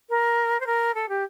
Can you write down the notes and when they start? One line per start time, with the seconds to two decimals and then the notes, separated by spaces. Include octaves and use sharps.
0.10 A#4
0.60 C5
0.67 A#4
0.94 A4
1.09 G4